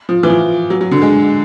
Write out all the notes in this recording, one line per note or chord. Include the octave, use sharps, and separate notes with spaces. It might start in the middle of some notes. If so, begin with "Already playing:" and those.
F3
E3
F3
F#3
F#3
D3
G#3